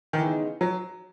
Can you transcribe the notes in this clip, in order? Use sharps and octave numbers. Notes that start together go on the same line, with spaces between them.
D#3
C#3 E3 G#3 B3 D#4
F#3